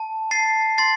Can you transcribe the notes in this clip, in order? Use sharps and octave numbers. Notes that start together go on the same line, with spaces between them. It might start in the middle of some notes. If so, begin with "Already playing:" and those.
Already playing: A5
A5 A6 C7
C6 A6 C7